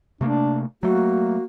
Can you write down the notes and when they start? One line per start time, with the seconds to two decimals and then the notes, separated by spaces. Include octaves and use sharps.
0.21 C3 A3 A#3 D4
0.83 F#3 A3 A#3 F#4